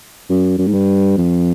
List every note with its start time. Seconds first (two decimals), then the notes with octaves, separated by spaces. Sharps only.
0.30 F#2
0.58 F#2
0.67 G#2
0.74 G2
1.17 F2